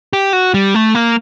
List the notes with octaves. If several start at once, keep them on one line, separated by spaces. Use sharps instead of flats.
G4
F#4
G3
A3
A#3